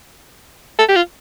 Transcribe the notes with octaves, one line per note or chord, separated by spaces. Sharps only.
A4
G4
F4